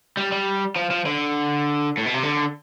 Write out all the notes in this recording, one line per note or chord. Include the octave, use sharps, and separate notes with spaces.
G3
G3
F3
F3
D3
A2
B2
C3
D3